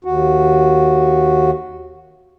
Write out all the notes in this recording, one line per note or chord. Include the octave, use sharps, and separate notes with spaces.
D#2 F#4